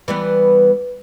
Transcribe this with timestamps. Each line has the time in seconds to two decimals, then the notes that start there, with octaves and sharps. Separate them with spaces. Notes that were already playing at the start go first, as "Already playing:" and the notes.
0.08 E3 G3 B3